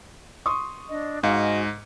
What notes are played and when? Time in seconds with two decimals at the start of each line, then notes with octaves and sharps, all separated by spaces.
0.46 C6 C#6 D#6
0.89 D4 D#5
1.23 G#2 F#4 D#5 F5 G#5 C#7